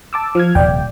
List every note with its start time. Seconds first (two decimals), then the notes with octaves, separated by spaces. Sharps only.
0.13 A5 D6 E6
0.35 F3 F6 G#6
0.55 D#1 C3 D5 G5